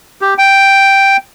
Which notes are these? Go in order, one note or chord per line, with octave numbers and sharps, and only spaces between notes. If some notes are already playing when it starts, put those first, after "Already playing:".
G4
G5